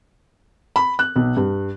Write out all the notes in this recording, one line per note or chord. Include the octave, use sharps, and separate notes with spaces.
B5
F#6
B1
G2